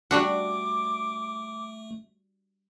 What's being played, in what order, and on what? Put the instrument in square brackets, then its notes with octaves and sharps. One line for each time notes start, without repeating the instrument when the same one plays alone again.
[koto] G3 D4 F#4 [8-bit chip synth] A3 [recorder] D6